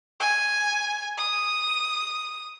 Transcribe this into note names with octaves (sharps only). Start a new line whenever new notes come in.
G#5
D#6